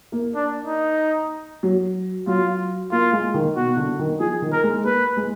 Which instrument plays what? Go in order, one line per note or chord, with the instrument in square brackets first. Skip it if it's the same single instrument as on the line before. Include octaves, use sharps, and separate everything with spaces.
[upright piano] A#3
[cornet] D4
D#4
[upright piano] F#3
[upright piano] F#3 [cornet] F4
[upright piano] A#3 [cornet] F4
[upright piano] G#3
D#3
[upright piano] B2 [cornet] F#4
[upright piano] D3
D#3
[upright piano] F3 [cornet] G#4
[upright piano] D#3
[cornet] A#4
[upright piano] G#3
[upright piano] A#3 [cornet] B4
[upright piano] G#3